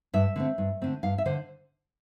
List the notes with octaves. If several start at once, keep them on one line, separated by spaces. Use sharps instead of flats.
G2 E5
D3 A3 C4
G2
D3 A3 C4
G2 F5
E5
D3 C5